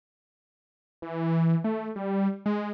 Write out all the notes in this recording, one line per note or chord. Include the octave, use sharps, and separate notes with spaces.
E3
A3
G3
G#3